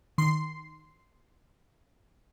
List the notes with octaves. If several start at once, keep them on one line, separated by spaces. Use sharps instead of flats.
D#3 C6 C7